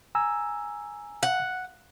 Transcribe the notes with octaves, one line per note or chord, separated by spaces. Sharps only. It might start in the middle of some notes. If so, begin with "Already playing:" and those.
G#5 A#5 E6
F#5